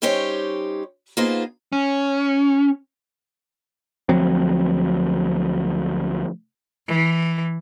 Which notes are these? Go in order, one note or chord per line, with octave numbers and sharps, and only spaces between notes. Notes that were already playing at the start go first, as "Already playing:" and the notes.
G3 C#4 D#4 G4 C5 C#5
A#3 B3 D#4 F4 G#4 C5
C#4
D2 F3 F#3 C4
E3